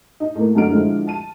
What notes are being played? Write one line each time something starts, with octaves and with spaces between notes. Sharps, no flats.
D#4
A2 A#3
F#2 D3 D#4 F#4 F6 D7
D3 F3 G#3 E4
A5 D#7